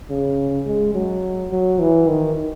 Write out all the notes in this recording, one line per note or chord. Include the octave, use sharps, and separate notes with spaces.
C#3
G#3
F#3
F#3
E3
D#3